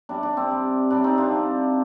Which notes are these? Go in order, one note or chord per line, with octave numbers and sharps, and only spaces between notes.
C3 G3 D4
D4
C4
C3 G3
C3 G3 D4
C4 D#4
D4 F4
C3 G3